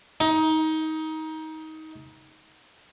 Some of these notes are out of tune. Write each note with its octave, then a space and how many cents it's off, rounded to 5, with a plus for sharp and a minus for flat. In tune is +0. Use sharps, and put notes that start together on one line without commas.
D#4 +20